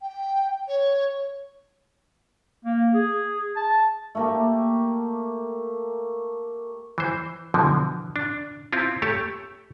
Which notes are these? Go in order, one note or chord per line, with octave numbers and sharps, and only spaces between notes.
G5
C#5
A#3
G#4
A5
A3 A#3 G4
E3 C5
B2 D3 E3 F3
D4
C4 E4 F4
A3 G4 C#5 A5